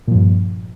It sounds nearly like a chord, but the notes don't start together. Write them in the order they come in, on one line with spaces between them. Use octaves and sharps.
A#2 F3 G2